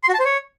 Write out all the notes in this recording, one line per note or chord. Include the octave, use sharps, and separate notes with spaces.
C6
F#4
A5
C5
C#5